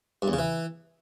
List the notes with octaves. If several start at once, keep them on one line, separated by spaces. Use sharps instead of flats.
G2
E2
C#3
E3